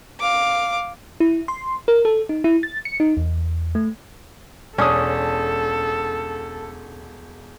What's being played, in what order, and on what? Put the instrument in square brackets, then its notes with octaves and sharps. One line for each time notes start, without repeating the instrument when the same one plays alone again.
[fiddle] F5 D6
[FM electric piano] E4
C6
A#4
A4
D#4
E4
A6
C#7
D#4
E2
A3
[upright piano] E1 D#6 [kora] C#4 D4 [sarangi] A4